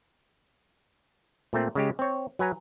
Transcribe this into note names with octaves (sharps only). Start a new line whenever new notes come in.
A#2 A3 C4
C#3 G#3 G4
C4 C#5
F#3 B4 G#5 A#5